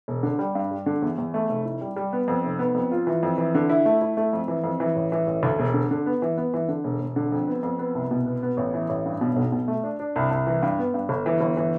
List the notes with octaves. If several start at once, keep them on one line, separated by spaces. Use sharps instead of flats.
E1
D3
G3
G2
G3
D3
E2
E2
A3
F1
E4
G3
G3
B3
F2
F1
B3
F2
F4
E3
F2
E3
D3
E4
A3
E4
A3
F2
E3
F2
E3
A1
E3
A1
D2
E1
D3
D3
B3
E3
B3
E3
D3
E1
E1
D3
F2
B3
F2
B3
C2
B2
B3
B3
A1
E3
A1
G2
B2
B1
B2
A3
D4
D4
C2
C2
E3
G2
B3
G2
G1
E3
G1
E3